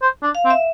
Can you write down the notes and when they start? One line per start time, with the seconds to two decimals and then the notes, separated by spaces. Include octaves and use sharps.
0.02 C5
0.23 D4
0.35 F5
0.45 C4
0.50 E5